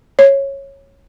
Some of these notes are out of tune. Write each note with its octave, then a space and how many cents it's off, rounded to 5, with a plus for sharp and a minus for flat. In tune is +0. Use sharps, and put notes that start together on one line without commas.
C#5 -15